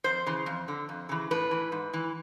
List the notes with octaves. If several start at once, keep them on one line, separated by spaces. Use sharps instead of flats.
F2 C5
C#3 E3
F2
D3
F2
C#3 E3
A2 B4
E3
G#2
E3